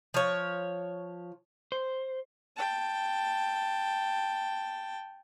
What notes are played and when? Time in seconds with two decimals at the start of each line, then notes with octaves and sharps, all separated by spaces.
0.14 F3 C#5
1.72 C5
2.56 G5 A5